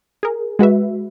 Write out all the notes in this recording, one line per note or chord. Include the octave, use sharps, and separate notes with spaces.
G#4 A#4
G#3 F#4 B4 E5